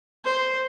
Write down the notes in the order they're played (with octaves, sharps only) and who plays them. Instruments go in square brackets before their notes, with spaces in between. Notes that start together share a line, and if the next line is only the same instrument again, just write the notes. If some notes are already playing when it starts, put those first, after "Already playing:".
[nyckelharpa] C5